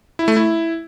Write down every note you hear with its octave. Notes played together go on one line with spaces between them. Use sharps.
E4
A3
E4